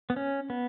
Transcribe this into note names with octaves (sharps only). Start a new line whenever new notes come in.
B3
C#4
B3